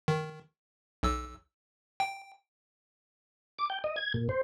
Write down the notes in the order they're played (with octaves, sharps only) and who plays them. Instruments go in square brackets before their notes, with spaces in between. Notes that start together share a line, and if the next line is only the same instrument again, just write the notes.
[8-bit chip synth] D#3
B1 E6
G5
[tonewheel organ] D6
G5
D#5
G#6
A#2
C5